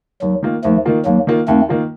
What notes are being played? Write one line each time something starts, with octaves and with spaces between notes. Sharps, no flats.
D#2 F#3
D#3 A#3 F4
D#2 F3 A3
D#3 A#3 F4
D#2 F#3 A#3
D#3 A#3 F4
D#2 A3 C4
D#3 A#3 F4